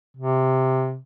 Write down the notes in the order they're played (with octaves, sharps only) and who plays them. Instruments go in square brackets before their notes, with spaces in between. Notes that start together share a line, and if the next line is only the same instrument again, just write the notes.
[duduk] C3